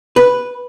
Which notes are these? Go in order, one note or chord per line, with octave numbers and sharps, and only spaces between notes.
B4